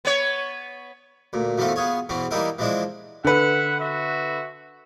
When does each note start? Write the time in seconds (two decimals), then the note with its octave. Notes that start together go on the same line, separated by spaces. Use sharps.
0.05 B3 C#5
1.33 D2 A#2
1.58 F#2 E3 A3 B3 C4 F4
1.76 B3 F4 G#4 C#5
2.09 E2 B2 E3 C4 C#4
2.31 E3 G3 A#3 D#4 E4 A#4
2.59 E3 F3 G#3 C4 D4 E4
3.24 D3 B4 E5 F#5
3.79 F#4 E5